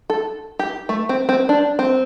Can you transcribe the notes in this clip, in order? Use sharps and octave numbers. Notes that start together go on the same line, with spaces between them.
A4
G4
A3
C4
C4
D4
C4